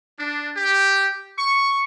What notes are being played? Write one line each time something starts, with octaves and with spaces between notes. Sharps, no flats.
D4
G4
C#6